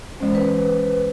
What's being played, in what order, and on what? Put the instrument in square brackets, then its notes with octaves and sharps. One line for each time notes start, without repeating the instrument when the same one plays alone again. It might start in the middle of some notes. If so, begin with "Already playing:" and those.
[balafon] E3 G#3 C#4 [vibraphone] C5
[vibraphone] B4